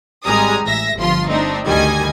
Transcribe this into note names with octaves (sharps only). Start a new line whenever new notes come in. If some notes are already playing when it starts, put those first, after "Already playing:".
G#1 G3 G#3 G#5 A#5 D#6
A1 E5 A#6
G1 F3 F4 C6
A3 C4 D4 D#4
D2 D#3 G3 D#5 G#5 G#6